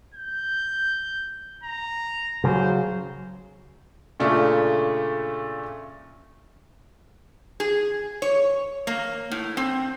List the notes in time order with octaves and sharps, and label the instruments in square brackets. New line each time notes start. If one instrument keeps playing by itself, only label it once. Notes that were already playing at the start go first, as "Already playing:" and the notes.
[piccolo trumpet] G6
A#5
[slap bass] C#3 F#3 [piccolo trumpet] C5
[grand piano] A#2 C#3 A3 D4
[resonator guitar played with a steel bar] G#4
C#5
A#3
A2
C4